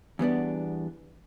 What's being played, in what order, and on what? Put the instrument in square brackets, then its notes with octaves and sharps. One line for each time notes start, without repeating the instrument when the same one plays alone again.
[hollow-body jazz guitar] E2 G3 B3 D4